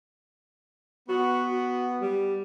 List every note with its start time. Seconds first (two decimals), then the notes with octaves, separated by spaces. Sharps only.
1.09 B3 F#4
1.52 F#4
2.02 G3